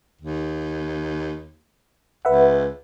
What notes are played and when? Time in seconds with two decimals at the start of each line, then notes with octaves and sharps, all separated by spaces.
0.21 D#2
2.25 C#2 B4 E5 F#5